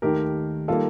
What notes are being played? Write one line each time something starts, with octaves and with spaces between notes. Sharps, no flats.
D#2 D#3 A3 G4 A#4
D#3 G3 A#3 F4 A4